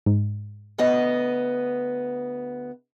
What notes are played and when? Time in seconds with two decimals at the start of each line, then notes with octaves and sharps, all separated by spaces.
0.06 G#2
0.78 D2 B3 D#5